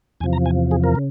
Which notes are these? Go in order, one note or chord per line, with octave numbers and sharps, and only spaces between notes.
E2 C3 F3 G#5
A#5
G#5
G#4
A#4
C#3